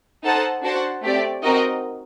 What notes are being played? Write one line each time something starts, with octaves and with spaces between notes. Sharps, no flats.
D#4 A4 C5 F#5 A5
D4 F#4 C5 F#5 A5
A3 C4 G4 D5
C4 D#4 F#4 A#4 D#5